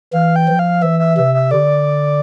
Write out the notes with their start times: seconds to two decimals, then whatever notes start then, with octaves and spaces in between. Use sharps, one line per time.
0.13 E3 F5
0.36 G5
0.48 F3
0.59 F5
0.82 E3 E5
0.99 E5
1.17 C3 E5
1.34 E5
1.51 D3 D5